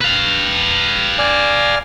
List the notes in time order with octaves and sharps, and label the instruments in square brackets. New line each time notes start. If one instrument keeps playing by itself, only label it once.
[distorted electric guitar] B4 F5
[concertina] D5 G#5 F6